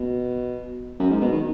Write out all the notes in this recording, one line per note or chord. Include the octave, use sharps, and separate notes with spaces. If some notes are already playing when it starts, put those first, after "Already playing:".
Already playing: B2
F#2
G#2
B2
D#3